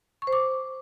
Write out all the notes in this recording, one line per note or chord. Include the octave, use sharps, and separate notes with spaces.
C#6
C5
D6